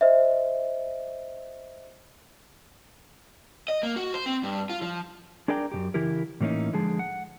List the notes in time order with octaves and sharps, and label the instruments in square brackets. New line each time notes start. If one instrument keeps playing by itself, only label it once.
[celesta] C5 D#5 E5
[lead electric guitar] D#5
A#3
F#4
C5
C4
G2
F4
F3
[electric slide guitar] D4 G#4 A#4 D5 G5 A#5
F#2 A#2 G4
C#3 E3 E4 G4 A#4
A2 E3 A#3 C#4 D#4
D3 F3 G#3 G#4 A5
F#5